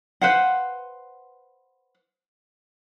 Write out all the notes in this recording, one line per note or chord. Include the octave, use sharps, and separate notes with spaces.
B4 C5 F5 F#5